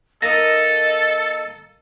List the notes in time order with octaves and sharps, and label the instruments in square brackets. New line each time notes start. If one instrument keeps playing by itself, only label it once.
[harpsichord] A#3 D#4 D#6 [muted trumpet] A4 [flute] D#5 [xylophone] A#6